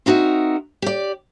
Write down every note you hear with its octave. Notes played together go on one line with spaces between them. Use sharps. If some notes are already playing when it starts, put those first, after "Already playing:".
C4 D#4 F#4 A#4 E5
G4 D5